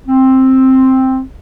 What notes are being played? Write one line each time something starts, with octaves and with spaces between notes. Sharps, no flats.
C4